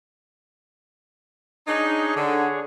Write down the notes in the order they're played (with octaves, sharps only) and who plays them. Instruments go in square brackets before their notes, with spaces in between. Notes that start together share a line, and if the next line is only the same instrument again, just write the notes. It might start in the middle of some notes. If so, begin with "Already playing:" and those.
[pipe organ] D4 G#4 C#5 [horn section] D#4
[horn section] D3